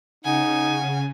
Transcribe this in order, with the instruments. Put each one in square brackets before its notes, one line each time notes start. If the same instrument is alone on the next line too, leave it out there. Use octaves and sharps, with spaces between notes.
[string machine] C#3 [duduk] D#4 [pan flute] F#5 [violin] G#5